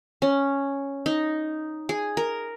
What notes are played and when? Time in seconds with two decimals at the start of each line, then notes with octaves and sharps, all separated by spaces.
0.22 C#4
1.06 D#4
1.89 G#4
2.17 A#4